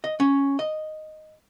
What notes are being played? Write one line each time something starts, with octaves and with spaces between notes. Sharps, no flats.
D#5
C#4
D#5